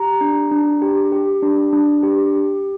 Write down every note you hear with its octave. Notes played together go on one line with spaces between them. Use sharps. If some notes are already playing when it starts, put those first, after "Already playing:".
Already playing: G4 A#5
D4
D4
G4
G4
D4
D4
G4
G4